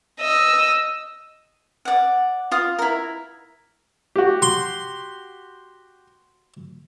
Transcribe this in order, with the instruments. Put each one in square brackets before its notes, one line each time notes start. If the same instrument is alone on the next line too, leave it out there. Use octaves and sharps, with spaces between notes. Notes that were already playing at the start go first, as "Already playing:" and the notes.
[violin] D#5 E6
[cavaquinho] D5 F#5
F4 D#6
E4 A#4
[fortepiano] F#4 G4
[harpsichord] C6